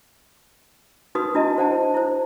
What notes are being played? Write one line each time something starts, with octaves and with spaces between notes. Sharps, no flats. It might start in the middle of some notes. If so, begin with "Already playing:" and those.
D#4 F#4 B4 C6 D#6
D4 E4 F#4 D#5 A5
C5 F#5 A5
E4 C5